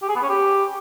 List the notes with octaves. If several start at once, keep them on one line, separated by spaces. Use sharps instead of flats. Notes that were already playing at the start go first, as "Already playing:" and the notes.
G4
G#4
B3
C#4
G4